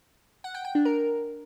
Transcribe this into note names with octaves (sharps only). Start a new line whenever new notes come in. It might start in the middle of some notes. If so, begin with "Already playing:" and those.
F#5
G5
G5
D4
A#4